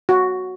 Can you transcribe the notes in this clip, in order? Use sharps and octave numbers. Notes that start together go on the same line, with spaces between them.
F#4